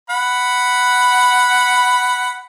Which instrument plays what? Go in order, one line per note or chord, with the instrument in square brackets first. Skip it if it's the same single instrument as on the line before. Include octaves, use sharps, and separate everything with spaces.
[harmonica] F#5 B5